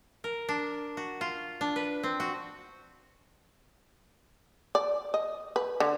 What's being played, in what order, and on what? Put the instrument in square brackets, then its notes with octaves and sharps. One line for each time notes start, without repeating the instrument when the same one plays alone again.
[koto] A#4
D4
F#4
F4
D4
B4
C4
F#4
[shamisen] D5
D#5
B4
D3